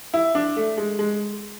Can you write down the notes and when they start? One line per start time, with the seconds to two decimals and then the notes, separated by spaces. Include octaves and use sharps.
0.14 E4
0.35 D4
0.56 A3
0.78 G#3
0.99 G#3